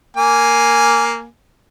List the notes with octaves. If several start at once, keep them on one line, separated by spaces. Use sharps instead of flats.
A#3 G#5